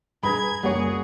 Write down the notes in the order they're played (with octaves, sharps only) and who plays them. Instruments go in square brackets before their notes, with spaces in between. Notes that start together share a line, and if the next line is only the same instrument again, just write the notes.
[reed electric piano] G2 B4 [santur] G#4 G#5 A#5 [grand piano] B5 [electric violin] G#6
[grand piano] F#1 C#5 [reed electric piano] G3 A#3 [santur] F#4 [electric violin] G#4